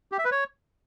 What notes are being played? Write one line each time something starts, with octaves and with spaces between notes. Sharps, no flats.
G4
E5
B4
C#5